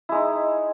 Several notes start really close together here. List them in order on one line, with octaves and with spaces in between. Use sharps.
E4 G#3 D#4